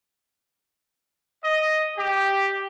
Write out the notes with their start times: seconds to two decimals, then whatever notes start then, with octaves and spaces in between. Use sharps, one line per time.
1.43 D#5
1.97 G4